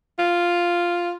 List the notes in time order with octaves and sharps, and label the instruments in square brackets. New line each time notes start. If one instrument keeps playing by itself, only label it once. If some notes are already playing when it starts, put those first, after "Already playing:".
[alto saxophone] F4